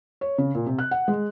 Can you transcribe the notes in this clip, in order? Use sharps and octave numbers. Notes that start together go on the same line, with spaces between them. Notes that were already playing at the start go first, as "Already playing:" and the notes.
C#5
C#3
A#2
C3
F#6
F#5
G#3